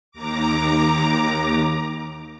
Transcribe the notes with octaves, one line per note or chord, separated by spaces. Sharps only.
D#2 A#5 D6